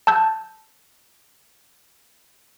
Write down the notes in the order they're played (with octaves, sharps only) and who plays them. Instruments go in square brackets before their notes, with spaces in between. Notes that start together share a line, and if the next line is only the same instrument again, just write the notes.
[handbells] A5 E6 G6